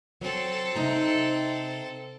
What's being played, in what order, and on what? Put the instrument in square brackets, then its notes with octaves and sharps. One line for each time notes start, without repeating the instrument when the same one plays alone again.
[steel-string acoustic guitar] F#3 [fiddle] C4 A4
[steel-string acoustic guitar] C3 D#4 A#5